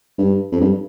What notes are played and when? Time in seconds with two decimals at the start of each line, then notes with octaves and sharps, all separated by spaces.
0.19 G2
0.52 F2
0.61 G2